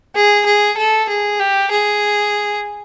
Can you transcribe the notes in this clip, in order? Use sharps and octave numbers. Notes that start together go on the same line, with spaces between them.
G#4
G#4
A4
G#4
G4
G#4